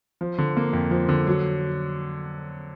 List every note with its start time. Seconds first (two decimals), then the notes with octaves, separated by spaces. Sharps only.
0.21 F3
0.38 D3
0.57 A#3
0.73 F2
0.91 F3
1.09 D3
1.27 F#3